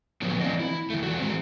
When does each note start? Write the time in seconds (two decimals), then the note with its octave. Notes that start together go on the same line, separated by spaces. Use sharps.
0.22 A2 D3 F3 F#3 A#3 B3
0.41 E3 C4 D4 C5 D5 D#5
0.59 E4
0.90 D#3 A3
1.03 E3 F#3 F#4
1.19 G#3 C4